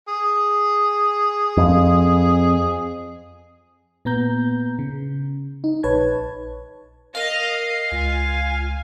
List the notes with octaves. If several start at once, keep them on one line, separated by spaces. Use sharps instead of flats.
G#4
F2
A#2 B3 A#5 G6
C#3
D#4
A#1 B4 C#5 A5 G#6
A#4 D#5 F5
C#2 F4 G#5